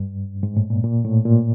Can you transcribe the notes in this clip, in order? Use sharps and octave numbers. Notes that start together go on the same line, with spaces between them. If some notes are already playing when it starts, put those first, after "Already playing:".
Already playing: G2
G#2
A2
A#2
A#2
A2
A#2